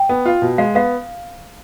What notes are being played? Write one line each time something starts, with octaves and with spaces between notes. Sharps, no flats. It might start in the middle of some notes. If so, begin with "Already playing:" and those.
Already playing: G5
B3
F4
B2
G#3 F5
B3 F5